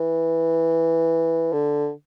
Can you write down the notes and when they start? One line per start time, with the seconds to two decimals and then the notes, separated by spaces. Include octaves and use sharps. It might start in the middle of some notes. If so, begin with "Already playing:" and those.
Already playing: E3
1.53 D3